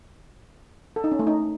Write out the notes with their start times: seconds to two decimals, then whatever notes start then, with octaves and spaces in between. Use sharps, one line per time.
0.96 A4
1.04 D#4
1.12 C#4
1.19 A3
1.27 D#4